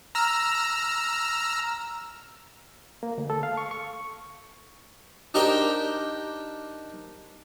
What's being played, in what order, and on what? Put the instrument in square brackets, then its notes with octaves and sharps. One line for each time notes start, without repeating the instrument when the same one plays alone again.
[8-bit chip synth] A#5 E6 F6
[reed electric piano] A#3
D2
A4
F5
C#6
C#6
[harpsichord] D4 D#4 G4 A#4 C5 G5